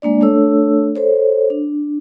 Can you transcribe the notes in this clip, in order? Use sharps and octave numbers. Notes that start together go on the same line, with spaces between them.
G#3 A#3 D4 D5
A3 D4 A4 C#5 E6
A4 C5 C#5
D4